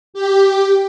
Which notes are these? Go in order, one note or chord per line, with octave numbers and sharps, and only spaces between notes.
G4